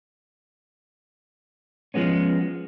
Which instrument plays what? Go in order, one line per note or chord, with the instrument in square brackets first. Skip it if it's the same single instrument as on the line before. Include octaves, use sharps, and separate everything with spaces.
[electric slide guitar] F3 G#3 B3 C#4